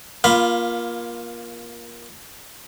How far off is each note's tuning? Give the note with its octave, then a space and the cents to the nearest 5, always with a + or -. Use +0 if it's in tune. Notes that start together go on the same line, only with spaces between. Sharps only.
A#3 +20 F4 +0 B5 +0